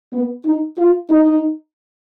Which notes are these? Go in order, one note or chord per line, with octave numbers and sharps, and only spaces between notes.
B3
D#4
F4
D#4